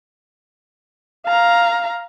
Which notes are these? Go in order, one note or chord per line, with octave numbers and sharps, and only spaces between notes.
F5 A#5